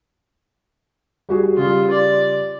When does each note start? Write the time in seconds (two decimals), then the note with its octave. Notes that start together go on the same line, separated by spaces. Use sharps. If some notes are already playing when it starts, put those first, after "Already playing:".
1.29 G3 F#4 G#4
1.57 C#3 G3 F4
1.90 D5